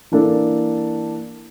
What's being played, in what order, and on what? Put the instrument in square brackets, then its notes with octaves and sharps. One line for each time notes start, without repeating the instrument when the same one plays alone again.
[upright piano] E3 A#3 D4 A4